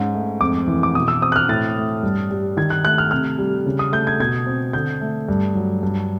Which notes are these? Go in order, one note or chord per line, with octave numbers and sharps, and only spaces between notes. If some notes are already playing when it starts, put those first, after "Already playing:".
Already playing: G#2 C#4
A3
F2 D6
E3
D6
B2 D#6
E6
C4 D#6
F#6
F6
A2 A6
A3
G2
G3
D#3 G#6
F#6
A3 F#6
F6
C3 F6
G3
C#3
D#6
A3 G6
G#6
B2 G#6
C4
D3 G6
A3
G2
F#3
G2